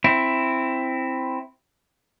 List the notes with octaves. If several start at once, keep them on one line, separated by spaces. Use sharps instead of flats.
C4 E4